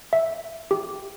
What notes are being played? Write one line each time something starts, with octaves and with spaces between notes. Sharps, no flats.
E5
G4